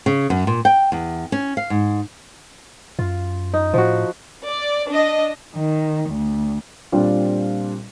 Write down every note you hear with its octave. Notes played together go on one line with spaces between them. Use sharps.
C#3
F#2
A#2
G5
E2
C#4
F5
G#2
F#2 F4
D#4
A2 F3 F#4
D5
D4 D#5
D#3
D2
A#2 G3 C4 D4 F4